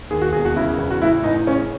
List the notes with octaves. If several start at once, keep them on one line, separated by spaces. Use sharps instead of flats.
D#2 G#4
F#4
E1 G#4
F#4
C#3 E4
E2
F#4
A2 E4
A1 D#4
C#3 C#4